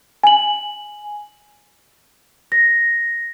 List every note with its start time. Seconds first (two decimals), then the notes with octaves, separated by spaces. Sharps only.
0.24 G#5 F#7
2.52 A#6